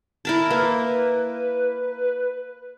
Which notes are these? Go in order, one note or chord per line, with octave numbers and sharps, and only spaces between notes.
E4 A#4 A5
A#3 B4